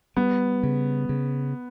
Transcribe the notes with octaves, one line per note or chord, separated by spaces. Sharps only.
G3 B3
C#3
C#3